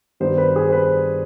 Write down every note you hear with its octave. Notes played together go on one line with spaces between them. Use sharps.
G2 D#3 G3 B3 C5
B4
G#4
C5
B4